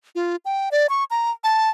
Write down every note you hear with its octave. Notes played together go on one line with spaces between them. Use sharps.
F4
G5
D5
C#6
A#5
A5